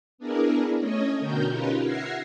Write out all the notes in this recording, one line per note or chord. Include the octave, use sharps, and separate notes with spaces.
B3 D4 E4 G#4 A#4
A3 C#4 C#5 D#5
B2 D3 F#4 A#4 G5 G6
C#4 D#4 F4 G4 A#4 B4
E5 F#5 F6 G#6 A#6 C7